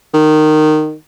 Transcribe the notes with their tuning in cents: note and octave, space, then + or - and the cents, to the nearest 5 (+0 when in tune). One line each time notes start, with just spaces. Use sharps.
D#3 -15